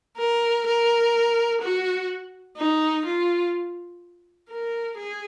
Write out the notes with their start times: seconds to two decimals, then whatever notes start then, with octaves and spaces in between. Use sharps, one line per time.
0.17 A#4
0.66 A#4
1.62 F#4
2.57 D#4
3.05 F4
4.49 A#4
4.97 G#4